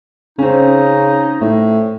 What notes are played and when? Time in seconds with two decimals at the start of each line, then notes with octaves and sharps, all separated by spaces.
0.39 C#3 C4 C#4 D#4
1.41 A2